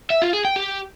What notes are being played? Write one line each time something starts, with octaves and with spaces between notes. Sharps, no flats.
E5
F4
G#4
G5
G4